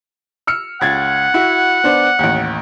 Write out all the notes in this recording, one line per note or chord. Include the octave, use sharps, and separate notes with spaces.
E6 F6 C#7
C#2 F#5 G#6 A6
E4 F#4
B3 D4 C5
A1 D#2